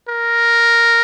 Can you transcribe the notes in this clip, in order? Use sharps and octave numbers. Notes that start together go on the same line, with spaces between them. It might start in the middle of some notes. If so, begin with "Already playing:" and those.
A#4